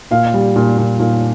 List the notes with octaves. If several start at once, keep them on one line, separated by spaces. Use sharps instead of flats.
A#2 F5
G3
A#2
A#2
A#2